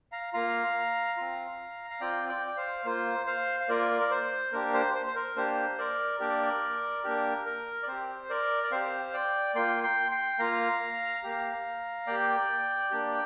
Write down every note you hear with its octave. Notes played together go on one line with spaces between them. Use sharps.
F5 A#5
A#3 F4 F5 A#5
C4 F4
F5
C4 F4 D5 G5
D5 G5
G5
C5 F5
A#3 F4 C5
C5 F5
F5
A#3 F4 A#4 D5
A#4
C5
A#3 D4 G4 A#4
C5
C5
C5
A#4
A#3 D4 G4 C5
A#4 D5
A#3 D4 G4 A#4 D5
A#3 D4 G4 A#4
A#4
D5
C4 G4 C5
A#4 D5
D5
C4 G4 C5 F5
D5 G5
A#3 F4 G5 C6
G5 C6
G5 C6
A#3 F4 F5 A#5
A#3 G4
A#3 G4 D5 G5
A#3 D4 G4